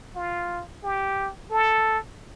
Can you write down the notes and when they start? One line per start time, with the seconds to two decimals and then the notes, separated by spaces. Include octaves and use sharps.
0.16 F4
0.83 G4
1.51 A4